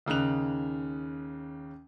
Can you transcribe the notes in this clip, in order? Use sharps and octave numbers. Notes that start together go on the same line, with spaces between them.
D#2 C#3 D#4 F#6 F7